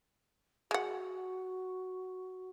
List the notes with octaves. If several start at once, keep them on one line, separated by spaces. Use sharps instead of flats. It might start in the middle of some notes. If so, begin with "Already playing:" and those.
G#3 F#4 F#5